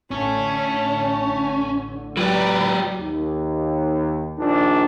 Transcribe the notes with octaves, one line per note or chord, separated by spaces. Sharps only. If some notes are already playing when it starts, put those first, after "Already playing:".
A1 D3 A3 C#4
F#3 G4 B4 D5 A#5
D#2
A#1 D#3 D4